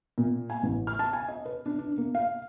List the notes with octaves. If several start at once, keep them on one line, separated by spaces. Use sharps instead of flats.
A#2
G#5
A1
F6
A5
G#5
D#5
B4
D4
D4
A#3
F5